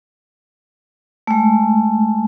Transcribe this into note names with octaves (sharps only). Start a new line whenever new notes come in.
G#3 A3